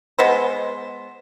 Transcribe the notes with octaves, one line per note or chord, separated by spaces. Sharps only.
G#3 B3 C5